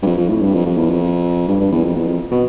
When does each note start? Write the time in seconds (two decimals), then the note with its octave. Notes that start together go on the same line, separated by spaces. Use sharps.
0.02 G2
0.06 F2
0.17 F2
0.29 A2
0.41 G2
0.54 F2
0.66 F2
0.78 E2
0.89 F2
1.48 G2
1.60 G2
1.72 E2
1.84 F2
1.96 E2
2.07 F2
2.31 B2